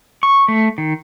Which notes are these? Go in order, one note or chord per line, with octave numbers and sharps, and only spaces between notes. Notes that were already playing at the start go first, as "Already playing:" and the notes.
C#6
A3
D#3